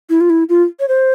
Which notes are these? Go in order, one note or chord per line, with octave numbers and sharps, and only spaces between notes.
E4
F4
E4
F4
C#5
C5